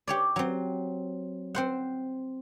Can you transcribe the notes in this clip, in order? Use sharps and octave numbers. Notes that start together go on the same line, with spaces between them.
G4 C#5 D5
F#3 C4
C4 C5 F#5